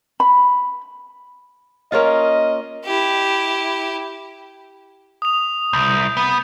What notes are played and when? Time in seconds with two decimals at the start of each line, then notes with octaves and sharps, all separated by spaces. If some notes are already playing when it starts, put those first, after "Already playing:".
0.20 B5
1.92 A#3 C#4 F4 D#5
2.85 E4 G4
5.22 D#6 F7
5.73 C2 G6
6.17 B3